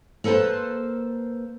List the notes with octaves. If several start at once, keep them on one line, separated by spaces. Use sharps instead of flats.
A#3 A4 B4 C5 A5